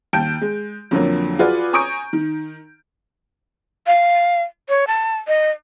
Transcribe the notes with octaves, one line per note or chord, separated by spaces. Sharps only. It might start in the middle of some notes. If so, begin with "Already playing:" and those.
D#2 G5 A5 G6 D7
G#3
F2 D3 F3 F#3 A#3
F4 F#4 G#4 B4 D5
G#5 A#5 C#6 D#6 G6 D7
D#3
F5
C#5
A5
D#5